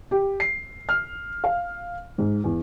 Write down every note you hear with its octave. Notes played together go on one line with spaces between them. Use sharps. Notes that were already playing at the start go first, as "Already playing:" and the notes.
G4
C7
F6
F5
G#2
E2